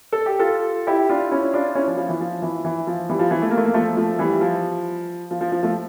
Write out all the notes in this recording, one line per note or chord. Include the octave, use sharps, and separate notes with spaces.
A4
G4
F4 A4
E4 G4
D4 F4
C#4 E4
D4 F4
C#4 E4
F3
F3
E3
F3
E3
E3
F3
E3 G3
F3
E3
A3
A#3
A3
A#3
F3 A3
F3 A3
E3 G3
F3
F3
F3
F3
F3 A3